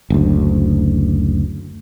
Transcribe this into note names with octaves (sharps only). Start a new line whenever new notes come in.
F#1 D2